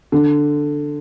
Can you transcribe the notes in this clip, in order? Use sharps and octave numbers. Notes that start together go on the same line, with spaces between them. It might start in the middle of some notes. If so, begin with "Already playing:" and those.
D3